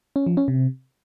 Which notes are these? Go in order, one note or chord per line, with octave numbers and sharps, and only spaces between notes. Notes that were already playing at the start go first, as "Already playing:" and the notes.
C#4
F3
C#4
C3